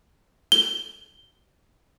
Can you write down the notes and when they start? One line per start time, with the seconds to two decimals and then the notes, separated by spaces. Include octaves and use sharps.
0.52 G7